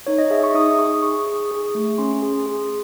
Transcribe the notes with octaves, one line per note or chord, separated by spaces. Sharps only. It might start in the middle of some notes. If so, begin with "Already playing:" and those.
D#4 C#5
D#5
G#4 E5
C#6
D#4 D#6
D#6
G#4 C#6
G#4 C#6
G#4
G#4
A3
C#4 C6
G#4
G#4